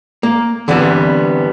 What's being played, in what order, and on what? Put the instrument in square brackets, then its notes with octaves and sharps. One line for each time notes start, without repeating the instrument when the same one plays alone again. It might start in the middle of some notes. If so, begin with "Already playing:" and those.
[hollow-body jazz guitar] A#3
D3 E3 G3 B3 C4